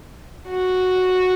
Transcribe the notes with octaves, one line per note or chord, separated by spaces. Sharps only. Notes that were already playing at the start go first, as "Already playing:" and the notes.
F#4